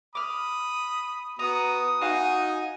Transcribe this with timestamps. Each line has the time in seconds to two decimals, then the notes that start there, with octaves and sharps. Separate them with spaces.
0.15 B5 D6 D#6 F6
1.39 B3 F#4 A#5 D#6
2.01 D#4 F#4 F5 G#5